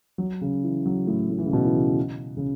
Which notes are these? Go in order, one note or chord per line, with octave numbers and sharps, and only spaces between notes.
F#3
C#3
E3
F#3
A2
A2
E3
C#3
B2
E3
C#3
C#3